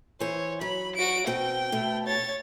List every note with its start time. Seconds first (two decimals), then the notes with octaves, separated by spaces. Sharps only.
0.20 E3 C5 C#5
0.61 F#3 B5
0.95 F#4 D7
1.27 B2 C4 G5
1.72 B2 A3
2.06 C#5 A6